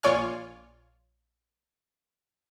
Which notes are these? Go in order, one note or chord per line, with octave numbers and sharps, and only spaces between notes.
A#1 F4 C#5 D5 G#5 F6